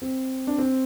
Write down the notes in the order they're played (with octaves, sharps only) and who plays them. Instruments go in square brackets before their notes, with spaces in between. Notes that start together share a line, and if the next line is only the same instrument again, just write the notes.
[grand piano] C4
D4
C4